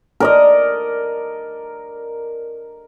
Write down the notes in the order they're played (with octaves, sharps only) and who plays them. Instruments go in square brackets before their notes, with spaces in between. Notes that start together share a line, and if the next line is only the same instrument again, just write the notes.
[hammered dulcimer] A#4 D5 D#5